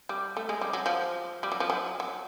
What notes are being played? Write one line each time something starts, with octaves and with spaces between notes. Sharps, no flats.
G3
A3
G#3
G3
F#3
F3
G3
F#3
F3
F#3
F#3